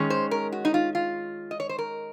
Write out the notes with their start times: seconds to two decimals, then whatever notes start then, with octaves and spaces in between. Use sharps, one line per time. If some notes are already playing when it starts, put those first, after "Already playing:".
Already playing: D#3 G#3 C#4
0.10 C5
0.31 A#4
0.52 F#4
0.65 D#4
0.74 F4
0.95 F4
1.51 D#5
1.60 C#5
1.69 C5
1.78 A#4